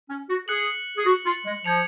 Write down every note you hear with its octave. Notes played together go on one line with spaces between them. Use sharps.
C#4
F#4
G#4 F#6 C#7 F#7
G#4
F#4
F4
G#3
F3 G#6 C#7 F7